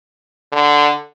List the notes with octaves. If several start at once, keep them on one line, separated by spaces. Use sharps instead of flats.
D3